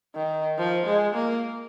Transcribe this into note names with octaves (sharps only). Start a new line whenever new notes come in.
D#3
F3
G#3
A#3